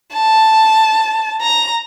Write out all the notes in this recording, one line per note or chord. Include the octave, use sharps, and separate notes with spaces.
A5
A#5